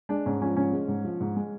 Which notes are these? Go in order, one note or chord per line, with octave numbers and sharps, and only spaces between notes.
G#3 D4
G#2 C#4
F3 C#4
G#2 C#4
G#3
G#2
F3
G#2
G#3